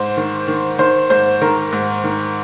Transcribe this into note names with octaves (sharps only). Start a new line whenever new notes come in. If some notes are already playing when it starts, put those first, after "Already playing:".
Already playing: G#2 C5
D#3
D#3
D#3 C5
G#2 C5
D#3 A#4
G#2
D#3